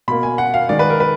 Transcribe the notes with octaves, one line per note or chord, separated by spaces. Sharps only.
B2 A#3 B5
G#5
F#5
F5
D#3 G#3 D5
B4
A#4
B4